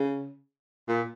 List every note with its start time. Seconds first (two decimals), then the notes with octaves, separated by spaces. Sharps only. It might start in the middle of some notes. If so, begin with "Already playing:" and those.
Already playing: C#3
0.89 A#2